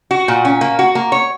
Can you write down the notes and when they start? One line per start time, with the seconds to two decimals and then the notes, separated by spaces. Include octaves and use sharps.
0.11 F#4
0.28 A#2
0.45 C#4
0.61 A#3
0.79 F#4
0.95 A#3
1.12 C#5